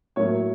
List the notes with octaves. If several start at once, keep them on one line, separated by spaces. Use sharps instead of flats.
A2 F#3 A#3 C#5